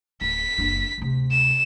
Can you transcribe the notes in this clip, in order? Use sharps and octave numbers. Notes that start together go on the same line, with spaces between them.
D1 B6
F#1 D3
D1 C3
E7